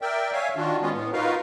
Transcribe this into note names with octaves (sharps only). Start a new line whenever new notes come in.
A#4 D5 E5 G5
C#5 E5 F5 G#5
D#3 D4 F4 F#4
G#3 B3 C#4 F4
A2 B3
D#4 F4 F#4 A#4 B4 F5